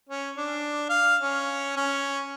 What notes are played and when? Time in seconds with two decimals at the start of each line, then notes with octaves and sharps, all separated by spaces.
0.09 C#4
0.37 D4
0.90 F5
1.21 C#4
1.77 C#4